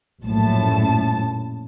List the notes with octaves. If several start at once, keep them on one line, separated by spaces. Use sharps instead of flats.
A#1 F#2 A2 A5